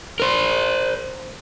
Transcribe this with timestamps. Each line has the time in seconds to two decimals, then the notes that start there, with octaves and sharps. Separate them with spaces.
0.20 A#4 C5